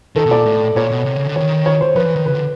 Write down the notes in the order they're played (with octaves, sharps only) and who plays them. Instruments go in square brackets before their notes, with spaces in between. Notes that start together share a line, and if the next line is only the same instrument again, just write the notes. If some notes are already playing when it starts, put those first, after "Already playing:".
[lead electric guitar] D#3 [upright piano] A4
[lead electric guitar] B2
[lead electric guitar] A#2 [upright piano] D5
[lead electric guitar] A2
[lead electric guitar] A#2 [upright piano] C#5
[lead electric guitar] B2
C3
C#3
D3
[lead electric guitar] D#3 [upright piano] C#5
[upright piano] C#5
C5
[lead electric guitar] F3 [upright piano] B4
[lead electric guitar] E3
D#3
[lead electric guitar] C#3 [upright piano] B4
[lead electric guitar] D3